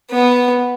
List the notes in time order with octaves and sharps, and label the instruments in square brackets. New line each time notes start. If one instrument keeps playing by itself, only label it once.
[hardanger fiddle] B3